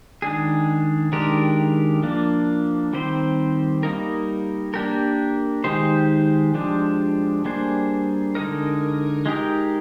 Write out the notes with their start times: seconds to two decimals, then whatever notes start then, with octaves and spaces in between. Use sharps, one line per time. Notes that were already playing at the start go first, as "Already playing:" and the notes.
0.22 D#3 G#3 D4 G#4
1.12 D#3 G#3 D4 G4 A#4
2.03 F3 A#3 D4
2.93 D#3 G3 C4 G4 C5
3.83 G3 A#3 D#4 A#4
4.74 A#3 D4 G4 A#4
5.64 D#3 G#3 D#4 G4 C5
6.54 F3 G#3 D4 G4
7.45 G3 A#3 D4 G#4 C5
8.35 D3 G#3 D#4 A#4
9.26 G#3 D#4 G4 A#4